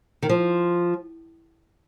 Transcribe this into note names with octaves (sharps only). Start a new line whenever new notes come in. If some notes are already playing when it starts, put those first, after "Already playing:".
D#3
F3